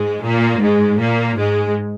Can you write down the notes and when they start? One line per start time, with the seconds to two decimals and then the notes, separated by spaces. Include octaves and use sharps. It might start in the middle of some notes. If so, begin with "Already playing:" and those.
Already playing: G#2 G#3
0.24 A#2 A#3
0.62 G#2 G#3
1.00 A#2 A#3
1.38 G#2 G#3